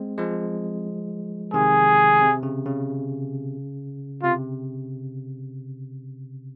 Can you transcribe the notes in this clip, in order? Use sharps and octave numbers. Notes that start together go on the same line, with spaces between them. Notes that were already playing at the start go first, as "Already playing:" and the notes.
Already playing: G#3 C4
F3 G#3
C3 D#3 G#4
C3
C#3
C#3
C3 F4